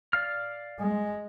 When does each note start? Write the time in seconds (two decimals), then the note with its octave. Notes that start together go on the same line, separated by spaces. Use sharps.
0.13 D5 F5 F6
0.79 G#3